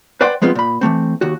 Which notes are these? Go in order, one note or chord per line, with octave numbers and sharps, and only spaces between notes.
B4 C5 D5 F#5 G5 C6
F3 G#3 B3 C4 F4
A#2 B5
E3 F3 A3 C4
D#2 F#4